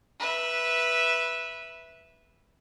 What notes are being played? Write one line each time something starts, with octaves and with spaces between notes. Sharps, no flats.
B4 E5